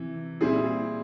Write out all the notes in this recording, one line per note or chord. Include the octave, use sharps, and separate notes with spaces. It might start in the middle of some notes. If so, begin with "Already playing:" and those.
Already playing: C3 E3
A#2 G3 C4 E4 G#4